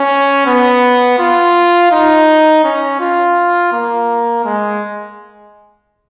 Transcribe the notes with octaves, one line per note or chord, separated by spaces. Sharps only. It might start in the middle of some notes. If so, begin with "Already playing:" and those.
Already playing: C#4
B3
F4
D#4
C#4
F4
A#3
G#3